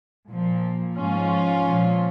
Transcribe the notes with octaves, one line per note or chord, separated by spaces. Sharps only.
A#2 F3
G#2 F3 C#4 F4
A#2 F3